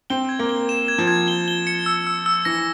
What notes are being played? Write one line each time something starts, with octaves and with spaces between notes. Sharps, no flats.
C4 G7
G#6
A#3
G7
E7
G#6
F3
G#6
G7
G7
C#7
E6
E6
E6
E3 A#6